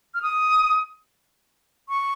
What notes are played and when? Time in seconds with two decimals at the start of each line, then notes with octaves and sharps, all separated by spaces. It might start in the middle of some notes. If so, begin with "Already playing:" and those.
0.14 F6
0.22 D#6
1.89 C#6